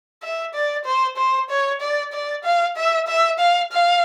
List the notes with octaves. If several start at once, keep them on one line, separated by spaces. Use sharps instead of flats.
E5
D5
C5
C5
C#5
D5
D5
F5
E5
E5
F5
F5